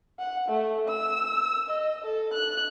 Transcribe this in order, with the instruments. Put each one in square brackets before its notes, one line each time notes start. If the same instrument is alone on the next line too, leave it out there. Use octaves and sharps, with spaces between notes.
[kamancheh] F#5
A3
E6
D#5
A4
F#6